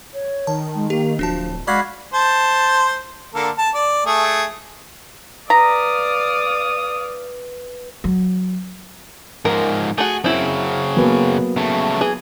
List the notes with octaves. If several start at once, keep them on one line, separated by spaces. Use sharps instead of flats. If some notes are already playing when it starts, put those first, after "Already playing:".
C#5
D#3 A5
G#3
A#3 G4
D1 F3 D4 F#4 A5
G#3 F#4 D5 F5 B5 D6 G#6
C5 A5
D3 A#3 A4
A5
D5
A3 G#4
B4 D5 F5 A#5 D#6
F#3
G#2 F3 A#4
A3 F#4 G#4
F#2 C#3 C4 E4
F#3 A#3 B3
C#3 A3
E3 G#4